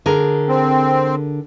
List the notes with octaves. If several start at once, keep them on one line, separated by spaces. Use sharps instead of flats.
D3 G#4 A#4
C4